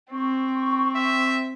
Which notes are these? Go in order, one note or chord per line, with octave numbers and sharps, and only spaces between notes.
C4 C#6
E5